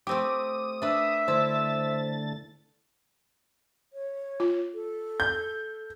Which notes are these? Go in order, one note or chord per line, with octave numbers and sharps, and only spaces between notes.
A3 C4 G4 D6 D#6
D4 B4 E5
D3 A3 E4 C5 A6
C#5
F4
A4
G6